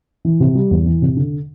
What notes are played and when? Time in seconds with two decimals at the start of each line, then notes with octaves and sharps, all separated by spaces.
0.25 E3
0.40 C3
0.55 G3
0.71 E2
0.86 E3
1.02 C3
1.17 D3